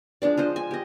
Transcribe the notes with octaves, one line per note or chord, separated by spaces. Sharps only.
F3 G#3 D4 D5
F4 C5 D#5
G#5
G4 D#5